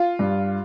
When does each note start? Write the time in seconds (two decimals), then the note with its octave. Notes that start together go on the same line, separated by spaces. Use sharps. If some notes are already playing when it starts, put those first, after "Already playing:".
Already playing: F4
0.19 G2